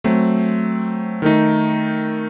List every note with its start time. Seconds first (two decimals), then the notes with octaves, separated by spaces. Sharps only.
0.04 F#3 A3 C4
1.22 D#3 A3 D#4